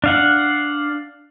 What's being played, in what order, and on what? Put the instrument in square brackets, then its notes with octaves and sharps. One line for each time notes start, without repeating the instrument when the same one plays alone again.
[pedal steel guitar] D4 F5 F#5